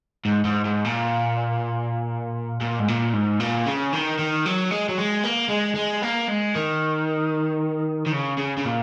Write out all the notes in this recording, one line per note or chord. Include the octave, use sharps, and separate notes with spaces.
G#2
G#2
G#2
A#2
A#2
G#2
A#2
G#2
A#2
C#3
D#3
D#3
F#3
G#3
F#3
G#3
A#3
G#3
G#3
A#3
G#3
D#3
D#3
C#3
C#3
C#3
A#2